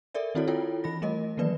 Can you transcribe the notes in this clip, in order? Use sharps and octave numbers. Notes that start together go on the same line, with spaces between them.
A4 A#4 D5 E5
D#3 C4 E4 F#4 A4 C#5
E4 F4 A4 C#5 G5
E3 B5 A#6
G3 A3 A#4 D#5
D#3 E3 F#3 A#3 B4 D5